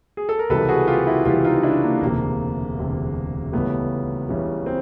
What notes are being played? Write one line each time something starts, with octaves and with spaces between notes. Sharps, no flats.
G#4
A4
A#4
C#2 C3 E3 G3 A4 B4
F#4 G#4
F4 G4
E4 F#4
C#2 C3 E3 G3 F4 G4
D#4 F4
D#4
D4 E4
A#3
E1 D2 C3 A#3
E1 D2 C3
C#2 C#3 E3 G3 A3 B3
C#2 C#3 E3 G3
C4